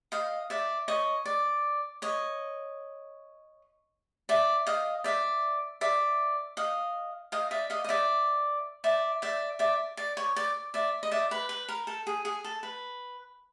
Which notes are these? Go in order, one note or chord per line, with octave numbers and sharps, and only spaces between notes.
D#5 F5
D5 E5
C#5 D#5
D5
C#5 D#5
D5 E5
D#5 F5
D5 E5
D5 E5
D#5 F5
D#5 F5
D5 E5
D#5 F5
D#5
D5 E5
D5 E5
D5 E5
D5 E5
D5
C#5
D5
D5 E5
D#5
D5 E5
B4
B4
A#4
A4
G#4
G#4
A4
B4